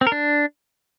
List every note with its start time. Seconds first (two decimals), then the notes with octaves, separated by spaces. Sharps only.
0.01 C4
0.07 A#4
0.12 D4